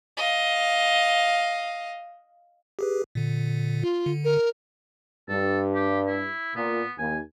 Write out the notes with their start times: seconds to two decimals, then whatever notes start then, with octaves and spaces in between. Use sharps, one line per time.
0.17 D#5 F5
2.79 G4 G#4 B4
3.15 A#2 D3
3.83 F4
4.06 D3
4.24 A#4
5.29 G2 A4
5.75 G4
6.07 E4
6.55 A#2 B3
6.98 D#2 G#5